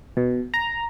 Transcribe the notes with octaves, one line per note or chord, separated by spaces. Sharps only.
B2
A#5